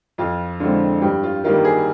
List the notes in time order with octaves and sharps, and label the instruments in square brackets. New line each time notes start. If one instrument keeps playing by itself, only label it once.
[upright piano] F2 F4
D3 F3 G#3 C4 F4
G2 G4
F4
D#3 G3 A#3 F4
G#4